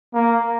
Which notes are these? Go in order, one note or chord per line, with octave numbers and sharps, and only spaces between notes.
A#3